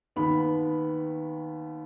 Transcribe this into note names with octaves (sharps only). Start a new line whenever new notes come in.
D#2 D#3 B3 B5